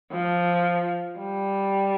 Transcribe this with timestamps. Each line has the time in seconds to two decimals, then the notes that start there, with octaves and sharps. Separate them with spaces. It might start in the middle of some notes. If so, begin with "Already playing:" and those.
0.11 F3
1.19 G3